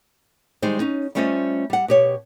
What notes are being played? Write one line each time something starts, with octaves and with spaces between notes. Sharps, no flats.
D#3 G3 G#3 D#4 C5
C#4 D#4
G3 A3 C#4 F4 C5 D#5
G3 F#5
B2 G4 C#5